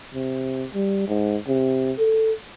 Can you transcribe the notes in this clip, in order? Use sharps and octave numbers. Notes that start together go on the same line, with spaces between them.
C3
G3
G#2
C3
A4